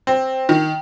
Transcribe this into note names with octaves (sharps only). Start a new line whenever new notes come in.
C4
D#3